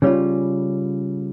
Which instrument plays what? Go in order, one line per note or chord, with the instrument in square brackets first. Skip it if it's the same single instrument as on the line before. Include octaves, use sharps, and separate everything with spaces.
[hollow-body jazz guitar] C#3 G3 C#4 F4